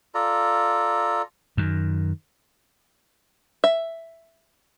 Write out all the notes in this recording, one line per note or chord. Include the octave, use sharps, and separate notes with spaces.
F4 A4 D5 A#5
F#2 D#3
E5